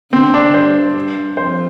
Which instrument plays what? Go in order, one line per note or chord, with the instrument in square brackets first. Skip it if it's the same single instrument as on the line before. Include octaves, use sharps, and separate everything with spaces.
[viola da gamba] D3 [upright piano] C4
[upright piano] D4
[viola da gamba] G2 [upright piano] C5
[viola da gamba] G2
[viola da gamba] F2 [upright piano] C5